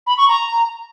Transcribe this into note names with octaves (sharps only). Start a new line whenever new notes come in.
B5
C#6
A#5